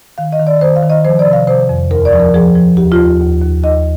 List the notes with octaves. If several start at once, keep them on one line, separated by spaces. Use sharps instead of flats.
D#3 F5
D#5
D#3
D5
D#3 C5
F5
D#3
D#5
F3 C5
D5
C3
F5
C3 C5
F2
D#2 A#4
D5
F3
A#4
F3 G#4
F3
D#2 G4
F4
D#2
D#2
D#2
D#2 D#5